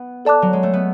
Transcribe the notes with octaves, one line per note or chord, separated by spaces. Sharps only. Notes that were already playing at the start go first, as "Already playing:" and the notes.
Already playing: B3
A4 D5 A5 D6 F#6
F#3
G#3
A3
B3